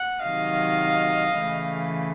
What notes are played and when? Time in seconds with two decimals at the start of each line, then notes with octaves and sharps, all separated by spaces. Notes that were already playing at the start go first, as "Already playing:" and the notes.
Already playing: F#5
0.22 C3 D#3 F#3 D#5 F5
1.35 C#3 E3 A3